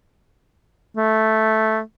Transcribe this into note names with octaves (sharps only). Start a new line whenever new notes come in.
A3